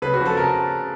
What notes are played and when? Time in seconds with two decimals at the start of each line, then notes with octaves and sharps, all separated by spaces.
0.02 C#3 B4
0.13 F#4
0.20 F3
0.26 A4
0.37 C#3 A#4